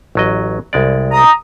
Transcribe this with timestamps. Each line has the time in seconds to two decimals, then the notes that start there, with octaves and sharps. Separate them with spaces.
0.15 A1 F#3 D#5
0.73 C2 G#3 D5
1.12 A#5 D#6